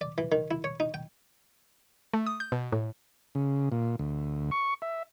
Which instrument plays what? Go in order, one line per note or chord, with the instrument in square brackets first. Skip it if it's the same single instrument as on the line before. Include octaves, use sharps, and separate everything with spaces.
[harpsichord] D5
E3
D#3
E4
C#5
D#4
G5
[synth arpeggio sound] A3
D#6
G6
B2
A2
[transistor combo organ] C#3
A#2
D2
C#6
E5